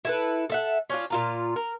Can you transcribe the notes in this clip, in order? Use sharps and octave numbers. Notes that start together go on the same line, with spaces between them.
E4 A4 B4
A4 E5 F#5
C#4 D4 F4
A#2 F4 A#5
A#4